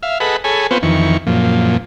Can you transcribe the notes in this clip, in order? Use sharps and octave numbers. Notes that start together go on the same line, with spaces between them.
E5 F5
G#4 A4 B4 D#5 F#5 B5
G#4 A4 C#5 G#5 B5
B3 C4 F4 B4 C5 C#6
F2 D#3 E3 C#6
F#2 A#2 F3